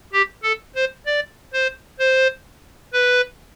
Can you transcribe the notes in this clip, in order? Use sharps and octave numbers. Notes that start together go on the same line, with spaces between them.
G4
A4
C5
D5
C5
C5
B4